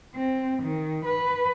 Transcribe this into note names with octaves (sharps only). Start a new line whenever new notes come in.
C4
D#3
B4